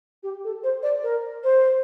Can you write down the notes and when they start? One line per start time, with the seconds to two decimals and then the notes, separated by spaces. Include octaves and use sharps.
0.23 G4
0.44 A4
0.63 C5
0.83 D5
1.03 A#4
1.44 C5